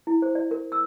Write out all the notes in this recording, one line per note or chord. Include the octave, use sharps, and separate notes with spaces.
E4
C5
D5
A#4
E6